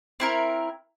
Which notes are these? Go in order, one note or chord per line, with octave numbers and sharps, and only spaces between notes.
C4 E4 A#4